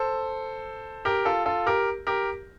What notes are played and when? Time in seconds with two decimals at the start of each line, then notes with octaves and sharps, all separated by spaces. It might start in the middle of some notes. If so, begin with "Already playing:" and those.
Already playing: A4 C5
1.05 G4 A#4
1.25 F4 A4
1.46 F4 A4
1.66 G4 A#4
2.07 G4 A#4